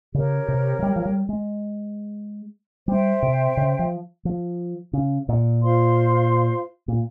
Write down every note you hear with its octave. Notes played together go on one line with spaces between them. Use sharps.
C#3 G4 A#4 C#5
C3
F3
G3
F3
G3
G#3
G3 C5 E5 G5
C3
C#3
F3
F3
C#3
A#2
F4 C5 F5 C6
A#2